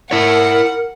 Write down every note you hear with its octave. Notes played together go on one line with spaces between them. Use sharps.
E4 A#4 C#5 F#5